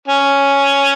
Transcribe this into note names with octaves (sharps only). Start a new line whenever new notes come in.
C#4